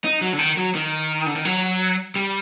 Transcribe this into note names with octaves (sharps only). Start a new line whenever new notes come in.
D#4
F#3
D3
D#3
F#3
D#3
D3
D#3
F#3
G3